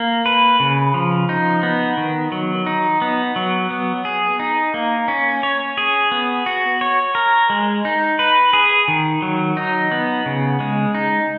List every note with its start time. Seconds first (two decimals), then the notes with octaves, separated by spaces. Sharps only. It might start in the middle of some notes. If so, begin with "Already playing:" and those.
Already playing: A#3
0.26 B4
0.60 C#3
0.94 F3
1.29 D#4
1.63 B3
1.97 D#3
2.32 F#3
2.67 D#4
3.02 B3
3.36 F#3
3.71 B3
4.05 G#4
4.39 D#4
4.74 A#3
5.08 C#4
5.43 C#5
5.78 G#4
6.12 B3
6.46 F#4
6.81 C#5
7.15 A#4
7.50 G#3
7.85 D#4
8.19 B4
8.53 G#4
8.88 D#3
9.22 F#3
9.57 D#4
9.92 B3
10.26 C#3
10.60 G#3
10.95 D#4